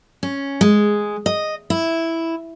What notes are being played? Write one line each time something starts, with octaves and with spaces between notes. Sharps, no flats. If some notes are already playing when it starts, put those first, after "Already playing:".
C#4
G#3
D#5
E4